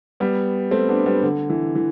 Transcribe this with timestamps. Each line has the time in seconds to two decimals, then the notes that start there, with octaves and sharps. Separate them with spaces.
0.20 G3 B3
0.71 A3 C4
0.89 B3 D4
1.06 G3 B3
1.23 D3
1.50 E3
1.75 E3